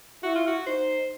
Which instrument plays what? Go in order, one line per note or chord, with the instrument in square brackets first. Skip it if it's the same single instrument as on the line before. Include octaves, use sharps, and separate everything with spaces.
[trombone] E4 [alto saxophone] F#4
[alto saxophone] F4
F#4
[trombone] D#4 [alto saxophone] C5